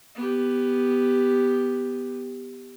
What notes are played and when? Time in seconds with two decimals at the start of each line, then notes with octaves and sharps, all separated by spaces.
0.15 B3 G4